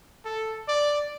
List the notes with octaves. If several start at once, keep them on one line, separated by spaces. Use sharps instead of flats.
A4
D5